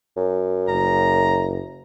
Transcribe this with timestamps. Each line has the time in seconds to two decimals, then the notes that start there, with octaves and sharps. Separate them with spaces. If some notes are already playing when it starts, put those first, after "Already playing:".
0.16 F#2
0.68 F#1 A#5